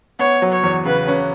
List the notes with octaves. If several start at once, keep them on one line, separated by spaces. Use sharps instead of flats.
B3 C#5
F#3
C#5
E2
C#3 B4
C#4